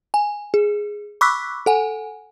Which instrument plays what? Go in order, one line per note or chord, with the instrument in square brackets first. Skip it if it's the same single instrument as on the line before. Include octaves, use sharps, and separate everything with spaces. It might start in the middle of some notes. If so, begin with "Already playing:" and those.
[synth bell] G#5
G#4
B5 C#6 D6 E6 F#6 B6
A4 F#5 G#5